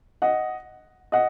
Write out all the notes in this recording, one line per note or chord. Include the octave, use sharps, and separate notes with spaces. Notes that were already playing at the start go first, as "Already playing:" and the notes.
D#5 F#5
D#5 F#5